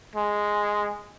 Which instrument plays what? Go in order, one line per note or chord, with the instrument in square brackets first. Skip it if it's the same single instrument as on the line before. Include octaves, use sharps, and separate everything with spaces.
[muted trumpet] G#3